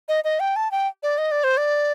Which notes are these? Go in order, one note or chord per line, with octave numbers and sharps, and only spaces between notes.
D#5
D#5
G5
A5
G5
D5
D#5
D5
C5
D5